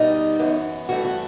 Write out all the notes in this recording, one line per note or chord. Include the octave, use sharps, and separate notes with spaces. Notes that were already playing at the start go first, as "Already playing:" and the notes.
Already playing: B2 G3 B3 D#4
F#2 E3 B3
G2 E3 A3 F#4
F#4